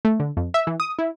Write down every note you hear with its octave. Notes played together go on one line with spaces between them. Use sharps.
A3
D3
F2
E5
E3
D#6
E4